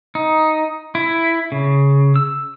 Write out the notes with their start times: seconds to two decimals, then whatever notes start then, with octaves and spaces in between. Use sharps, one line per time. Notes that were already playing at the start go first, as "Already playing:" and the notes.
0.15 D#4
0.95 E4
1.52 C#3
2.16 E6